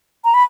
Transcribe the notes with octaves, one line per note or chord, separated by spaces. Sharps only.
A#5
B5